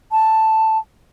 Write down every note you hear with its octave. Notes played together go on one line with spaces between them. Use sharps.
A5